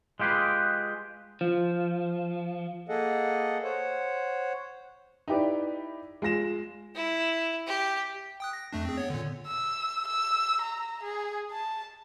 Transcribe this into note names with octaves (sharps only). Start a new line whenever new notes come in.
G#3 F4 G4 G#4 B4
F3
A#3 G#4 A4 D#5 F#5
C5 C#5 F#5
D#4 E4 G4 B4 D5
G#3 F4 A#6 E7
E4
G4
G5 D#6 F#6
A#6
F2 A3 D4
C4 G#4
B3 C#5
A#2 D3
E6
E6
A#5
G#4
A5